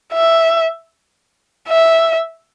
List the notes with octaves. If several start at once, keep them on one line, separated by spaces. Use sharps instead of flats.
E5
E5